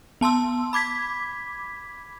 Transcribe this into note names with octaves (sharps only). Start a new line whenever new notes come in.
B3 A5 C6 E6
B5 D6 G#6 B6